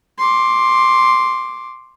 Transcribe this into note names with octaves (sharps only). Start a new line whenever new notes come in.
C6 D6